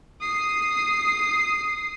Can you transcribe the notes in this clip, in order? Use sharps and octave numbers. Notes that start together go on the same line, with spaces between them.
D#6 C7